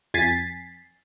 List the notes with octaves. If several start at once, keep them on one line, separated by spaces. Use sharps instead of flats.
F2 G#5 A6 B6 C7